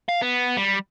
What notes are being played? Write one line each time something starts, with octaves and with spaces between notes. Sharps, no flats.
F5
B3
G3